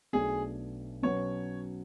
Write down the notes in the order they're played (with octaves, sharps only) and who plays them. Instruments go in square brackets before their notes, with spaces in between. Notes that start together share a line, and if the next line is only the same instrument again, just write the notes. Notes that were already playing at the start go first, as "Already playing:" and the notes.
[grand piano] B1 B2 A3 D4 [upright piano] G#4
[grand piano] B2 F#3 C#4 F#4 B4 [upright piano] C#5